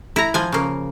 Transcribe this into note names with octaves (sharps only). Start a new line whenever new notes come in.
E4 A#5
F3 G#5
C#3 A#3